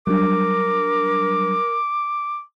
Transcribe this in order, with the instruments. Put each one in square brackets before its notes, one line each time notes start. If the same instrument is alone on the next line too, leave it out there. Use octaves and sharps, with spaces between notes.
[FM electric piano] F#3 G3 D4 [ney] A#4 [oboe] D6